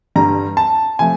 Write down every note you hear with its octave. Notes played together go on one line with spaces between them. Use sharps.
G2 D3 G3 A#5
A5
C3 F3 A3 G#5